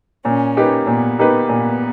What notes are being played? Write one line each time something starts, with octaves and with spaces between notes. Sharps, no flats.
A#2 C#4
A#3 D#4 G4 B4
A#2 B3
A#3 D#4 G4 B4
A#2 B3